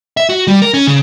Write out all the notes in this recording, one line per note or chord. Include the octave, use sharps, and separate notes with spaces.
E5
F#4
G3
A#4
C#4
C#3